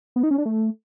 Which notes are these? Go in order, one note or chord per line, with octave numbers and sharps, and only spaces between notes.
B3
D#4
C#4
D4
A3